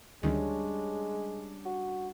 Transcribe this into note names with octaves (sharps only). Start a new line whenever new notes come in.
D2 D#3 G3 G#3 C#4 D4
F#4